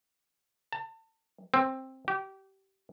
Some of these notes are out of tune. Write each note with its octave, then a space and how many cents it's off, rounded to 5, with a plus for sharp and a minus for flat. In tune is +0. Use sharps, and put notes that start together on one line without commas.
A5 +30
C4 +10
G4 -25